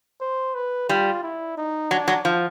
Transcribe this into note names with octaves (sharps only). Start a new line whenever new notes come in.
C5
B4
G3 F4
E4
D#4
F#3 D4
F#3
F3